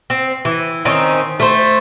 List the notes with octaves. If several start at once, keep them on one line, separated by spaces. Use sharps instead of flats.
C4
E3
D#3 C4 C#4 D#4
A3 C5